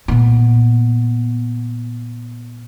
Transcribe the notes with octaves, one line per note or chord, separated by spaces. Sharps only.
A#2 B3